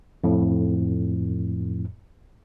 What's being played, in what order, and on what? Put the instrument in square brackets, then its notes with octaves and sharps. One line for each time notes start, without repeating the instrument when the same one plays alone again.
[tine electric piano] F2 A2